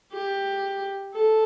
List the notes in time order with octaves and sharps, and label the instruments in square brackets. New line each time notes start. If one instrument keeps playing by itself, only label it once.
[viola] G4
A4